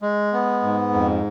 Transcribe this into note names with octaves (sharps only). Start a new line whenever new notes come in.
G#3
B3
G#2
F2